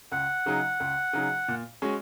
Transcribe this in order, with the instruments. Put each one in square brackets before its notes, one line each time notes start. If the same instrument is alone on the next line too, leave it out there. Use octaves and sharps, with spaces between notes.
[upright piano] C#2 [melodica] F#5
[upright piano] C#3 F#3 D#4 G#4
C#2
C#3 F#3 D#4 G#4
A#2
G#3 C#4 F#4